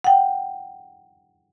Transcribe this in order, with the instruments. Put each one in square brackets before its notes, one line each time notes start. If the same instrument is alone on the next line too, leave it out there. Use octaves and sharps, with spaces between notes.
[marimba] F#5 G5